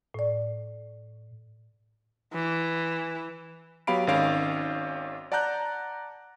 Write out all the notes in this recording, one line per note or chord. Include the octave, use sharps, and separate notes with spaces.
A2 D5
E3
F#3 B3 G4 F5 B5 D7
G#1 G#2 D#3 C#4 F5 D7
D5 F#5 A5 A#5 F#6 G6